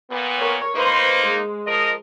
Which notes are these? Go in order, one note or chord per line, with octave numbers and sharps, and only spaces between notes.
A#2 B3
A#4 C#5
A#3 D#4 B4 C5 C6
G#3
F3 A#4 D#5